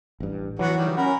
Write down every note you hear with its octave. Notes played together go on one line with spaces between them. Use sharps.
A1 G2
E3 F#3 B3 F#4
D#3 G3
C#4 A#4 F#5 B5